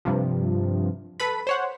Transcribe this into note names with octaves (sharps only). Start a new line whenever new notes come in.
G2 C3 F3
A4 B4 B5
C5 C#5 F#5